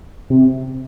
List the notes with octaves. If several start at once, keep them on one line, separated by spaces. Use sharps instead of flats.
C3